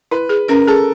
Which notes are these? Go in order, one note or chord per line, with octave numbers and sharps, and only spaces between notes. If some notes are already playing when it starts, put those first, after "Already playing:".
E4 B4
G#4
C#4 A#4
G#4 A4